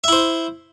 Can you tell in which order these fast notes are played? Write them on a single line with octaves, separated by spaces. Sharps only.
E5 E4 C5